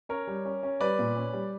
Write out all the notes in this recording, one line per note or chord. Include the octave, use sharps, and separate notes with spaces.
C#4 A#4 C#5
G3
C#4
C#4
G3 B4 D5
A#2
C#4
G3